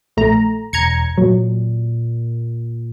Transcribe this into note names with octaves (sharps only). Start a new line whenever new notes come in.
A#1 A3 A#5
E1 A#5 G#6 C#7
A#2 F#3